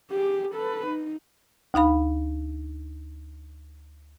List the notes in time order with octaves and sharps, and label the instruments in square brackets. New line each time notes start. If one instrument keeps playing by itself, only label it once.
[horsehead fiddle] G4 G#4
A4 B4
D#4
[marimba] D2 D#4 F5 B5